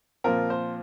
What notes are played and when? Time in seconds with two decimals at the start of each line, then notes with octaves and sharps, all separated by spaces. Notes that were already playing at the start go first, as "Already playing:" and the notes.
0.24 A#2 F3 C4 F4 A#4
0.50 C5